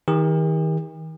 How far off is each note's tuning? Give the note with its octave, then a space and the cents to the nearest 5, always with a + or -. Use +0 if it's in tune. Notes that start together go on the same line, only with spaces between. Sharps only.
D#3 +35 G4 +45